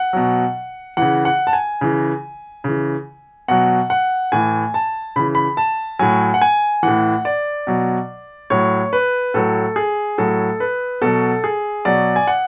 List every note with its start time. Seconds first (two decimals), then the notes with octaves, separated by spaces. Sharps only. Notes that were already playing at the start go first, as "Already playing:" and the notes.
Already playing: F#5
0.13 B2 F#3
0.97 C#3 E3 F#5
1.25 F#5
1.47 A5
1.53 G#5
1.81 C#3 E3
2.64 C#3 E3
3.48 B2 F#3 F#5
3.90 F#5
4.32 A2 E3 G#5
4.74 A5
5.16 C#3 E3 B5
5.35 B5
5.57 A5
5.99 A2 F#3 G#5
6.34 F#5
6.41 G#5
6.83 A2 E3 F#5
7.25 D5
7.67 B2 F#3
8.50 A2 F#3 C#5
8.93 B4
9.34 A2 F#3 A4
9.76 G#4
10.18 A2 F#3 A4
10.60 B4
11.02 B2 F#3 A4
11.44 G#4
11.85 B2 F#3 D5
12.16 G#5
12.27 F#5